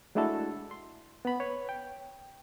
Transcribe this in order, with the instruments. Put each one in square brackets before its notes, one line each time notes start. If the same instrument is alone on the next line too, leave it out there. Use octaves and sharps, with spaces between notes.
[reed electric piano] G#3 A3 D4 E4 F#4 A4
C6
B3 B5
B4 C#5
G5